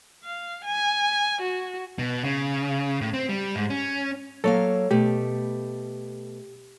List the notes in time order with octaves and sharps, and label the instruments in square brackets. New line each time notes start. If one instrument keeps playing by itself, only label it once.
[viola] F5
G#5
F#4
[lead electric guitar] B2
C#3
A2
C4
G3
G#2
C#4
[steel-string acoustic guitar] F#3 A#3 F5 [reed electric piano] A4 C#5
[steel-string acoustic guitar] B2 A3 [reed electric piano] G4